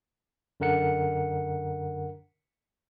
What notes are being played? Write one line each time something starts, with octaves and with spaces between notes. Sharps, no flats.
F#2 D3 A#4 F#5 C#7